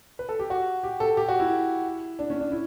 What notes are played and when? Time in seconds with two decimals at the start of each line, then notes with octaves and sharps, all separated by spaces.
0.19 B4
0.29 A4
0.39 G4
0.50 F#4
0.83 G4
1.00 A4
1.17 G4
1.28 F#4
1.40 E4
2.19 D4
2.30 C#4
2.40 D4
2.52 E4